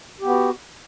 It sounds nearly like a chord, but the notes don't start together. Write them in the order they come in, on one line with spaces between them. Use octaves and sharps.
G4 B3 F#4